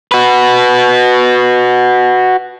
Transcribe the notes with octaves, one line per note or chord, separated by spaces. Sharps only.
F#4 B4